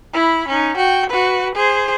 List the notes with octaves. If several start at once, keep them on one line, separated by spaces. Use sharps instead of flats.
E4 B5
C#4 D#4
F#4 G5
F#4 B4
G#4 C5